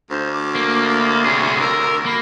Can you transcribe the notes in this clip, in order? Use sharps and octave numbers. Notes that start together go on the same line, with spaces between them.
D2 C5
D6
A#3
C3 G#4 C#5
A#4 E6
A#3 B5